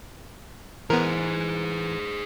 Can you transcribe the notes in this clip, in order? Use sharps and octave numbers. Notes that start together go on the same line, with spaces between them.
E3 B3 G#4 A#4 C5